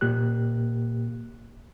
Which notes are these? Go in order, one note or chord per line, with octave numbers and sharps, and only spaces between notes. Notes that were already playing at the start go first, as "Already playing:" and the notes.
A#2 A#3 G4 F#6